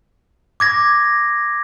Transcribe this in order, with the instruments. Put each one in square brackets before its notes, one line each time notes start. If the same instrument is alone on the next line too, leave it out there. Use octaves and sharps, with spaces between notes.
[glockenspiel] D6 G#6 A#6